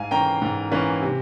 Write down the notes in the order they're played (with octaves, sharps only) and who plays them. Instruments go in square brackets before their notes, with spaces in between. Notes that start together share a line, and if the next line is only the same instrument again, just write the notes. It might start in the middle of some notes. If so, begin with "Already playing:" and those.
Already playing: [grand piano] G#2 F5 G#5
E3 A#3 C#4 G5 A#5
G#2
E3 A#3 C#4
C3